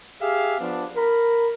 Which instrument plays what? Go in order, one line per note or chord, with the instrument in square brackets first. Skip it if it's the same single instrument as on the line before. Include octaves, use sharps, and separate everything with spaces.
[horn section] G4 G#4 E5 F5
F3 B3 D4
A#4 B5